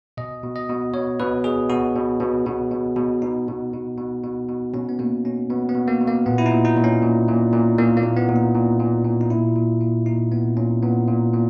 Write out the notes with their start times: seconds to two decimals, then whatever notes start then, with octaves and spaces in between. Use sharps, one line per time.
0.17 B2 D#5
0.43 B2
0.56 D#5
0.69 B2
0.94 B2 C#5
1.19 B2 B4
1.44 B2 G#4
1.70 B2 F#4
1.96 B2
2.20 B2
2.46 B2
2.71 B2
2.96 B2
3.22 B2 D#4
3.48 B2
3.73 B2
3.98 B2
4.24 B2
4.49 B2
4.74 B2 C#4
4.89 B3
4.99 B2 A#3
5.25 B2 C#4
5.50 B2 B3
5.69 B3
5.75 B2
5.88 A#3
6.01 B2
6.07 A#3
6.26 A#2 B3
6.38 E4
6.46 D#4
6.51 A#2
6.65 D#4
6.77 A#2
6.84 C#4
7.02 A#2
7.28 A#2
7.53 A#2
7.78 A#2 A#3
7.97 A#3
8.03 A#2
8.16 B3
8.29 A#2
8.36 D#4
8.55 A#2
8.80 A#2
9.05 A#2
9.21 D#4
9.30 A#2 E4
9.56 A#2
9.81 A#2
10.06 A#2 D#4
10.32 A#2 B3
10.57 A#2 C#4
10.83 A#2 B3
11.08 A#2
11.33 A#2